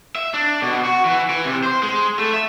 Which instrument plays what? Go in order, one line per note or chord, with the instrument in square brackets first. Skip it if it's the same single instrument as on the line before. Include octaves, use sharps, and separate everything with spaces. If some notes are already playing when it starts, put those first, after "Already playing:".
[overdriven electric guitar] E5
D4
B2
F#4
E3
E3
C3
C5
G#3
A3
E5